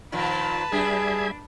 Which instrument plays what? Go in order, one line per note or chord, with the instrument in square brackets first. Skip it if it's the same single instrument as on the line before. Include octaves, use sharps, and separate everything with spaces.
[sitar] A#2 D#3 F3 [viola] B4 A5
[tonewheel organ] G3 E5 G#6 [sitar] D4 [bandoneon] G#4